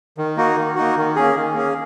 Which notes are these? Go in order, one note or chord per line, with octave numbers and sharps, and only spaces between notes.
D#3
A#3 D#4 F#4
D#3
A#3 D#4 F#4
D#3
A#3 C#4 G#4
D#3
A#3 C#4 G#4